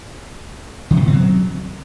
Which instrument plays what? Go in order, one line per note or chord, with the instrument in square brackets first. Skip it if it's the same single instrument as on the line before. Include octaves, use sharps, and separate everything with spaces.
[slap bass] D3
C3
B2
C4
F#3